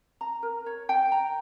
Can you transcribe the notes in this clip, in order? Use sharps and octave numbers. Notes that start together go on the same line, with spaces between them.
A#5
A#4
C#5
G5
A#5